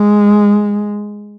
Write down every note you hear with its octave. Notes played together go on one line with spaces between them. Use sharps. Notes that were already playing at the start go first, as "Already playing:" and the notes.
Already playing: G#3